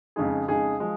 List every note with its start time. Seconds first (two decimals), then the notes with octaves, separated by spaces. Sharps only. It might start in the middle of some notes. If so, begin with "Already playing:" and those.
0.16 F2 C#3 G#3 D#4 G#4
0.48 F2 C#3 G#3 D#4 G#4
0.80 F3 G#3